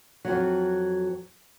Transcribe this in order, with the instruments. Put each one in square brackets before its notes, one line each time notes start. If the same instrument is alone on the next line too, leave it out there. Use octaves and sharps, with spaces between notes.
[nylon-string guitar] F2 F#3